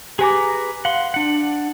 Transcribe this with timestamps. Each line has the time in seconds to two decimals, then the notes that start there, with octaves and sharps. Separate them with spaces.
0.19 G4 G#4 B4 G#5 A#5 D6
0.85 F5 F#5 C6
1.14 D4 F#5 C#7